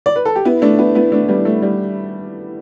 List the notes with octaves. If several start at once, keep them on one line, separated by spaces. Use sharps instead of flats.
D5
B4
A4
G4
B3 E4
A3 D4
B3 E4
B3 E4
A3 D4
G3 B3
A3
G3